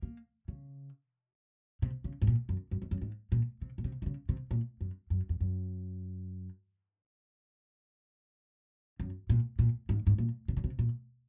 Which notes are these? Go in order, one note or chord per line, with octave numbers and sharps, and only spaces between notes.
A#3
C#3
C3
C#3
G#2
A#2
F#2
F#2
F2
F#2
G#2
A#2
C3
A#2
C3
D#3
C#3
C3
A#2
F#2
F#2
F2
F#2
F#2
A#2
A#2
G#2
G#2
A#2
C3
C#3
C3
A#2